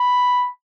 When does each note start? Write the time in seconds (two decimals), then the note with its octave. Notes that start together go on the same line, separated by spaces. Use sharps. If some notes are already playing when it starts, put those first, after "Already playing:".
Already playing: B5